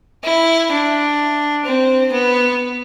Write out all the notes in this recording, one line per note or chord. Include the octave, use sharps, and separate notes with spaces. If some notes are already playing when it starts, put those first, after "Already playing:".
E4
D4
C4
B3